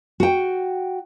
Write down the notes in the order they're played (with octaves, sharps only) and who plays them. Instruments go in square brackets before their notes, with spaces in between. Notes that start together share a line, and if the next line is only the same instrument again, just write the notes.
[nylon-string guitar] F#4 G5